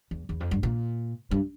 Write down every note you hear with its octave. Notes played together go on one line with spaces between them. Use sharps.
E2
E2
F2
G2
A#2
G2